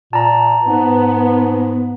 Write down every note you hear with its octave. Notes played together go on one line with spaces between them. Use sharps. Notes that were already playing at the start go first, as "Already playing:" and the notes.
A#2 A5 A#5
G#2 B3